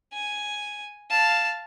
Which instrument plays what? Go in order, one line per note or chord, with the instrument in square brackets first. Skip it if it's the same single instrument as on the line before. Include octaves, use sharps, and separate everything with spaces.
[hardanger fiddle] G#5
F5 A5